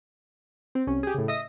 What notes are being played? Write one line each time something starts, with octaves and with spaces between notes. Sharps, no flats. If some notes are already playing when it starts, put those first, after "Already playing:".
C4
C2 C#4
G4 G#4
A2 C#3
D#5 E5 D#6 A#6